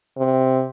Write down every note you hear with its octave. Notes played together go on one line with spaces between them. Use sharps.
C3